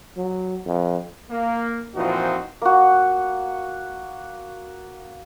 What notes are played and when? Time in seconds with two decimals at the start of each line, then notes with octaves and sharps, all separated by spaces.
0.17 F#3
0.66 F2
1.31 A#3
1.95 A#2 E3 F3 C4 D#4 F#4
2.62 A#3 F#4